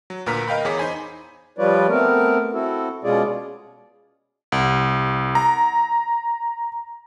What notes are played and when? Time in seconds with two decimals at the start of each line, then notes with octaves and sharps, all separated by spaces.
0.10 F#3
0.26 D2 A#2 A#4 B4 A#5 B6
0.48 A#4 D#5 F5 G5 B5
0.65 E2 G#4 C#5 D6 B6
0.78 D#4 C5 G#5 B5
1.58 F3 G3 F4 B4 C#5 D5
1.89 A3 B3 C4 A#4
2.53 C4 E4 F#4 A4
3.04 B2 G#3 C#4 F4 G#4 D5
4.52 C2
5.35 A#5